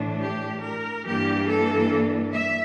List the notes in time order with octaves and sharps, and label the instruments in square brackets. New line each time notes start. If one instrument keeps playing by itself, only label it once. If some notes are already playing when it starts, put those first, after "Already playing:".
Already playing: [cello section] A2 E3 A3 D4
G4
A#4
G2 E3 A#3 D4 G4
A4
E5